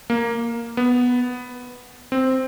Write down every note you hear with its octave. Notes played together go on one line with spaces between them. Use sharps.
A#3
B3
C4